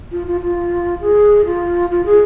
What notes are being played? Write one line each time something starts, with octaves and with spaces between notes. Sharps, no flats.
F4
F4
F4
G#4
F4
F4
G#4